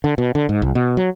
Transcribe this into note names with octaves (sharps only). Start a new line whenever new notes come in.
D3
B2
D3
G#2
C2
B2
F#3